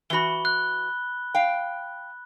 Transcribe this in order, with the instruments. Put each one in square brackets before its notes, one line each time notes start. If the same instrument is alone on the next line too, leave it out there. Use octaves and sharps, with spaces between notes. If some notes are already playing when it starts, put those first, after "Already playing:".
[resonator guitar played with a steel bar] E3 F#4 [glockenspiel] B5 G7
[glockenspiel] F#6
[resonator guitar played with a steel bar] F5 G5